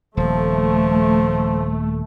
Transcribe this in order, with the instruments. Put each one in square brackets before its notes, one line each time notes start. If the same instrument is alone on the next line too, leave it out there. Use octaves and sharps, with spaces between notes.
[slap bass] D#1 [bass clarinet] F3 [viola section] A3